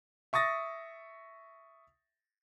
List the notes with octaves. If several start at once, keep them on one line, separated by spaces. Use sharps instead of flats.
E5 C#6 D#6 A6 A#6